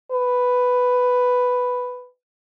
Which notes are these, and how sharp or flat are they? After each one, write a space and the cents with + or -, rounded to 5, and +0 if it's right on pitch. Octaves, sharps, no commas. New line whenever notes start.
B4 +5